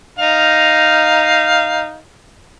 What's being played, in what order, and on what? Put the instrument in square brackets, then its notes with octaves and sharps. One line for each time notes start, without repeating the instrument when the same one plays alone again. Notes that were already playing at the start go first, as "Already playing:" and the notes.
[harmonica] D#4 F5